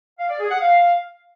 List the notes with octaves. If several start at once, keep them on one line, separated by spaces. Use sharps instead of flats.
F5
D5
G#4
F#5
F5